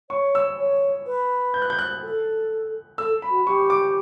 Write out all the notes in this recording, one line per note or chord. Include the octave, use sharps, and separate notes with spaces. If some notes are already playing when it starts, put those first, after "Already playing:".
C#5 C#6
E6
C#5
B4
G6
F#6
G6
F#6
A4
A4 E6
B5
F#4
G4 C#6
D6